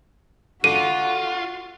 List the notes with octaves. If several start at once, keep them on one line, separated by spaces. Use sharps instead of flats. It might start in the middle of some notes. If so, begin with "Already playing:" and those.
D3 F4 F#4 D#7